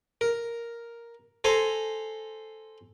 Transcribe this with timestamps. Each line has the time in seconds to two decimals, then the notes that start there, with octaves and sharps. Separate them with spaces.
0.21 A#4
1.44 A4 C5 G#5 A#5 C6